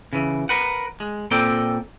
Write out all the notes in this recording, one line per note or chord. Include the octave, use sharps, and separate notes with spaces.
C#3 E3
A#4 B4 F#5
G#3
A#2 C4 A4 A#4 D5 G5